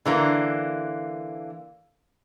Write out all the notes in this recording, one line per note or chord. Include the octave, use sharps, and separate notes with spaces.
D3 E3 A#3